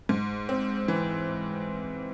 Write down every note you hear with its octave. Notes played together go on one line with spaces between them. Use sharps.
G#2
C4
E3